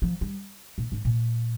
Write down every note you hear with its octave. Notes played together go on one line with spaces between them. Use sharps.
F3
G3
A#2
G#2
A#2